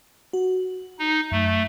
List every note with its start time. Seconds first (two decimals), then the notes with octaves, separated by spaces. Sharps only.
0.33 F#4
0.99 D#4
1.31 F#2 A3